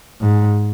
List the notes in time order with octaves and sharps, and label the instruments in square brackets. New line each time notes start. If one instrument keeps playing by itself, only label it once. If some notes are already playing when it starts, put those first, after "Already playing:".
[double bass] G#2